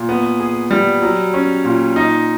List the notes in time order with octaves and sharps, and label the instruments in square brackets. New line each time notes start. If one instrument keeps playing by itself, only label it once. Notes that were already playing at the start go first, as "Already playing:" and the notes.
Already playing: [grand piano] A#2
B3
G#4
G3
F#3
C#4
A#2
D#4